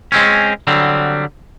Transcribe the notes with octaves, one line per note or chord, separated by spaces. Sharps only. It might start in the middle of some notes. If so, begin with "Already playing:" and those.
G#3 C4 C#4
D3 F#3 G3 C4